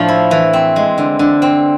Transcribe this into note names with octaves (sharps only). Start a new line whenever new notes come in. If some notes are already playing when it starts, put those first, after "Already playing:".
Already playing: A2 F3 A3 D4
E4
E3
C4
G#3
D3
D3
C4